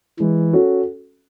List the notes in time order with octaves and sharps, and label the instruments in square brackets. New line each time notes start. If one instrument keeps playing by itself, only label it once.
[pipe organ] E3 [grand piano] G#3
[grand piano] C#4 F#4 A4